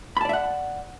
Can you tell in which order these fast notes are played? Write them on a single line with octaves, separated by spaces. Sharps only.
B5 A5 D5 E5 F#5